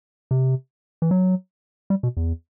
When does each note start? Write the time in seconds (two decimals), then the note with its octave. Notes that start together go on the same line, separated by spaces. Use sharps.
0.31 C3
1.02 E3
1.11 F#3
1.90 G3
2.03 B2
2.17 E2